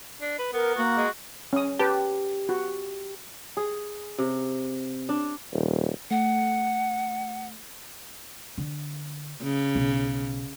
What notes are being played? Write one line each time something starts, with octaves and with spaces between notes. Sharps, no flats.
D4
B4
B3 A#4
A#3 F#4
G#3
C#4 D#6
G4 B4 A5
F#4
G#4
C3
D4
D#1
A3 F#5
D3
C#3
B1